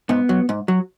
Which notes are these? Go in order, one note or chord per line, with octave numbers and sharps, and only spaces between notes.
G#2 B3
F#3
G#2
F#3